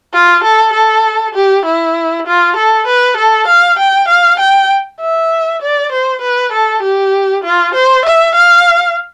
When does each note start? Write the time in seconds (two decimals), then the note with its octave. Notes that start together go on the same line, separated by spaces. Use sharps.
0.14 F4
0.44 A4
0.73 A4
1.35 G4
1.65 E4
2.27 F4
2.56 A4
2.87 B4
3.17 A4
3.48 F5
3.78 G5
4.08 F5
4.40 G5
5.01 E5
5.62 D5
5.92 C5
6.22 B4
6.52 A4
6.82 G4
7.44 F4
7.75 C5
8.05 E5
8.35 F5